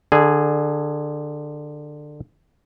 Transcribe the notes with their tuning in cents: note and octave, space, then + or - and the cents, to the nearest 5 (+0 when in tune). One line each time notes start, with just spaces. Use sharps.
D3 +20 G#4 +0